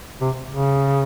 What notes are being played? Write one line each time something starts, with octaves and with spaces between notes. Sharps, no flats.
C3
C#3